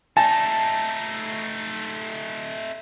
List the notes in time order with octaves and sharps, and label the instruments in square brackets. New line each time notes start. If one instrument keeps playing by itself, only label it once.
[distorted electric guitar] A3 D#4 [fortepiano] A5